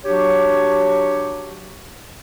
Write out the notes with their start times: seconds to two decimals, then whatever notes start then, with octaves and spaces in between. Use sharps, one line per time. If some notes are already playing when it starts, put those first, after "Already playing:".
0.05 F#3 D4 F#4 G4 C#5